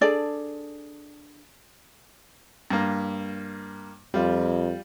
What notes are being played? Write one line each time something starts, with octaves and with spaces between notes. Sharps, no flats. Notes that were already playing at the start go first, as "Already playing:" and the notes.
D4 G#4 A4 D5
G2 A#3
F2 G3 F4